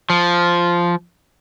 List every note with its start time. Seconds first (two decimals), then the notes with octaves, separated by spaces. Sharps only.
0.10 F3